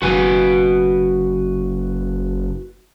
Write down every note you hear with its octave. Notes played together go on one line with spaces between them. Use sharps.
F#1 F#4 B4 G#5